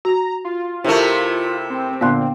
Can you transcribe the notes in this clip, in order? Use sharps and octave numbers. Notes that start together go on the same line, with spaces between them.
F#4 A#5
F4
C3 A3 E4 A#4
C4
A#2 D3 B3 F5 C6 F#6